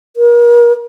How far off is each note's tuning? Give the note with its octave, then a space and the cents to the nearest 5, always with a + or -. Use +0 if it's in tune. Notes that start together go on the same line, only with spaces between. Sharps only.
A#4 +35